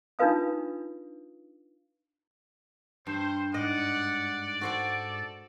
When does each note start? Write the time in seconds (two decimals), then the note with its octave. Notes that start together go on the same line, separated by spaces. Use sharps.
0.19 D4 D#4 F4 B4 F5 D#6
3.07 G2 C5 G6
3.54 G#2 D5 D#5 F#5
4.61 F#4 A4 C5 F#5